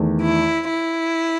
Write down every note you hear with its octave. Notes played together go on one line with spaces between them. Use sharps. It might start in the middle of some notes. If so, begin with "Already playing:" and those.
Already playing: E2 D#3 A3
E4
E4